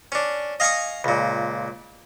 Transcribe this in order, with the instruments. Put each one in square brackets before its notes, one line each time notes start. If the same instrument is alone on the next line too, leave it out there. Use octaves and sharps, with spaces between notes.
[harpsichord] C#4 D4
D#5 F5 G#5 A#5 C#6 D#6
C#2 A#2